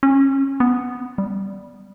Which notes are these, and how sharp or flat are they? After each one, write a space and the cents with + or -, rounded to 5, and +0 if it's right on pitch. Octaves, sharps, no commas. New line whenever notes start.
C#4 -25
B3 +0
G3 -5